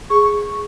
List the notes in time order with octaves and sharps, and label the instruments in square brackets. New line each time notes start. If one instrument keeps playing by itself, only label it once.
[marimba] G#4 [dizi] C#6